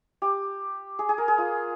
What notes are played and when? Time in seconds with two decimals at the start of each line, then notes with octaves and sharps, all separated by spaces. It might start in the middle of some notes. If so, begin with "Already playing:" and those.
0.22 G4
0.99 G#4
1.09 G#4
1.18 A#4
1.28 G#4
1.38 F4